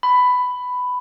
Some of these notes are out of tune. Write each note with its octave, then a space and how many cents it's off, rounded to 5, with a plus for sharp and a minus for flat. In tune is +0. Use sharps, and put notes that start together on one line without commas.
B5 +10